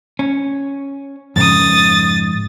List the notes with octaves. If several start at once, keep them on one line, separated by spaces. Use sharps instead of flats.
C#4
F2 G#2 C#3 D#6 A6